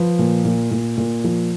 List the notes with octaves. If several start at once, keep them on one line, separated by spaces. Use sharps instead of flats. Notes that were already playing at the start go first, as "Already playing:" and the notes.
Already playing: F3 B4
A#2
A#2
A#2
A#2
F3